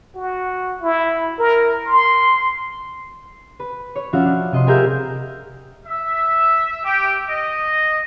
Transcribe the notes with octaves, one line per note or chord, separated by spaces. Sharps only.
F#4
E4
A#4
C6
B4
C#5
F3 C#4 F#4 E5 F5
D4
C3 D#5 C6
G4 G#4 A#4 E5 F5 G6
E5
G4
D#5